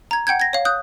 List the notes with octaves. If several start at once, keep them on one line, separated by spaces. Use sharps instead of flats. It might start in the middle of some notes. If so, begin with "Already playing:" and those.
A#5 G#6
F#5 G5 G6 G#6
G#6 A#6
C#5 F5
D#6 F#6 G6